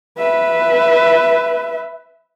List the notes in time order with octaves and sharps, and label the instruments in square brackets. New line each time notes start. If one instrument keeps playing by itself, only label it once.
[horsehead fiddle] B4 E5